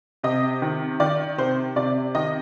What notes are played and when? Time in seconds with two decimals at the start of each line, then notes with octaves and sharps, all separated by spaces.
0.23 C3 D#5
0.62 D#3
1.00 D#3 D5
1.38 C3 C5
1.76 C3 D5
2.15 D#3 D#5